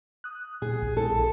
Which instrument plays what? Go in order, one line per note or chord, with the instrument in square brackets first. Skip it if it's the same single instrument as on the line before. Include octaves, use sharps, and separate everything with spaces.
[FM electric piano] D#6 F#6
[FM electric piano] A#2 [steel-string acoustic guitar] G#4
[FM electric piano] A#1
[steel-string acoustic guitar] A4